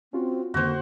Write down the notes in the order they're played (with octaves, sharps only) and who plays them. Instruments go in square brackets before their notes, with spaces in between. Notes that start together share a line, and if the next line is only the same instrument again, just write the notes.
[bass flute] C4 [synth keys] C#4 F4 F#4
[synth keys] F2 D3 D#3 [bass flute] A#3 [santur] F#4 C5